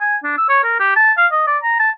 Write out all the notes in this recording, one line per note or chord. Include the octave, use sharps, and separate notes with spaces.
G#5
D4
E6
C#5
A#4
G4
A5
F5
D#5
D5
A#5
A5